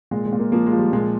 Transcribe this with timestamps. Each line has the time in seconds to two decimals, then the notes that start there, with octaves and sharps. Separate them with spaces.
0.11 A#2 G#3
0.26 G#3
0.32 A#2
0.39 A#3
0.52 F3 A#3
0.66 G#3
0.72 F3
0.79 G3
0.93 A#2 G#3